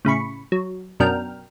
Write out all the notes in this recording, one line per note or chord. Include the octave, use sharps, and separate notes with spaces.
A2 C#3 B5 C#6
F#3
F#2 B2 D4 A#4 G5 F6